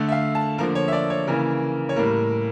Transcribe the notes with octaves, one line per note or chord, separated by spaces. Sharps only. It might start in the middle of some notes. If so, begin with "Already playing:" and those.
Already playing: D3 A3
E5
F5
A5
D3 F3 A#3 A#4
C#5
E5
D5
C#5
C#3 E3 A#3 A#4
C#5
A2 G3 A#3 A#4